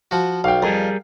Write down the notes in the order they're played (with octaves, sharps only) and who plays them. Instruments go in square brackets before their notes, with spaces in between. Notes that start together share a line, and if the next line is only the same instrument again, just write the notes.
[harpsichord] F3 F#4
[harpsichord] B1 [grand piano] F5 G5
[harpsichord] F2 [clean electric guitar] G3 G#4 A#4